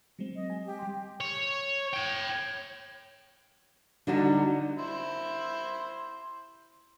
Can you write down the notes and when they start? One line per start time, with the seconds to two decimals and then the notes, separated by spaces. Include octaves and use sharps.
0.19 F#3 G#3 C4
0.35 D#5
0.50 G#5
0.66 G4
0.79 G3 C6
1.20 C#5
1.93 C#5 G5
4.07 D3 F#3 G3 D4 D#4 F#4
4.78 E4 C5